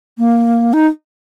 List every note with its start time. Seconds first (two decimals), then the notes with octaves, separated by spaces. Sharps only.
0.18 A#3
0.73 D#4